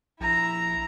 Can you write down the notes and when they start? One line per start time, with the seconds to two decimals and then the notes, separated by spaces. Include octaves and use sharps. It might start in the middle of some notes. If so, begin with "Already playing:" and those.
0.20 A#1 E4 A#5